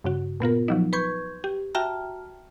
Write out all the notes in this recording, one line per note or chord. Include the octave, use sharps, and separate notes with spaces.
G2 C#3 F#4
A#2 B3 F4 A#4
F3 F#3 D#4
B4 C6 C#6 G6 G#6
G4
F#4 E5 G5 A5 A#5 F6